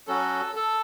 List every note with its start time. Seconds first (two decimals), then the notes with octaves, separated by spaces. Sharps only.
0.08 F#3 C#4 F#4 A4
0.55 A4